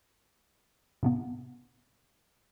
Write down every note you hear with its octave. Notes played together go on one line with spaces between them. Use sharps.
A2 C3 B3